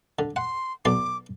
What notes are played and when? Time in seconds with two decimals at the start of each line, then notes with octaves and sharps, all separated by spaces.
0.19 D3
0.36 F#5 C6
0.85 B1 D5 C6 D6